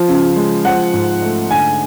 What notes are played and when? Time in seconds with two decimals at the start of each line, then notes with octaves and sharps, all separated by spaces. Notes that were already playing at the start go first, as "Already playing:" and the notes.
Already playing: F3
0.08 C#3
0.36 G#3
0.65 F3 F#5
0.94 G#2
1.22 A3
1.50 D3 G#5